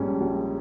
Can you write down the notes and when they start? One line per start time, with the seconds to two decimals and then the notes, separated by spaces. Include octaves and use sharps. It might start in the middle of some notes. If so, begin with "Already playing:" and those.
Already playing: A#1 G#2 G3 C#4
0.20 A#1